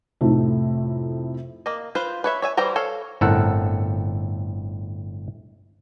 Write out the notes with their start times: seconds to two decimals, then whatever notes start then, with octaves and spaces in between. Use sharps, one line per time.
0.21 F2 A2 C3 A3 D#4
1.66 A#3 D#5
1.95 F4 B4 C5
2.24 B4 C#5 E5
2.42 C#5 E5 G#5
2.57 E3 G3 C5 G5 A#5
2.76 A4 C#5 F5
3.21 G1 A2 C4 A4 A#4 F#5